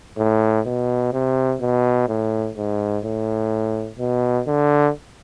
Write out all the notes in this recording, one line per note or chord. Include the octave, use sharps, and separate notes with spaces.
A2
B2
C3
B2
A2
G#2
A2
B2
D3